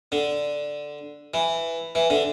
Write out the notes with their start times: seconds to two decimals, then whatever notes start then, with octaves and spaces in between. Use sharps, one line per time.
0.12 D3
1.34 E3
1.95 E3
2.10 D3